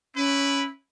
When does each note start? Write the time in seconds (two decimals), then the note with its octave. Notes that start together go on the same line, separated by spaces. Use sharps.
0.15 C#4 E4 B4